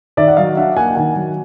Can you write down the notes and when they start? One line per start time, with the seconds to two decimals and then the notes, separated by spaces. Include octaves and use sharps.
0.17 D#3 D5 E5
0.28 F#5
0.37 F#3 D#5 F5
0.57 D4 E5 F#5
0.77 A#3 F#5 G#5
0.90 G5
0.95 D#3 F#5 G#5
1.15 F#3